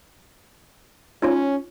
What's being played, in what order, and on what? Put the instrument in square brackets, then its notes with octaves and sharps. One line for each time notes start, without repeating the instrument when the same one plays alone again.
[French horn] C#4 [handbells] D#4 F4 C#5